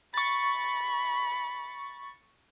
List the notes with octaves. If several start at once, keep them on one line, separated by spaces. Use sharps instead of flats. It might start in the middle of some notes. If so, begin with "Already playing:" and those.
B5 C#6 A6